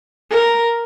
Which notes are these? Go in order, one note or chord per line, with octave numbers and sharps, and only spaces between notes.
A#4